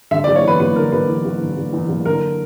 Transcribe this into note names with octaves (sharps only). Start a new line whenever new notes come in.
D3 E5
D5
F#1
C#5
E2 B4
F#1 B4
D3 A#4
F#1 B4
E2
F#1
D3
F#1
E2
F#1
D3 A#4